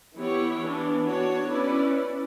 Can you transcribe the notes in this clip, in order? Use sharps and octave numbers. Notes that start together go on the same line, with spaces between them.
E3 B3 E4 G4 C#5
E3 B3 D4
B3 D4 F#4 C#5
C#4 E4 B4 D5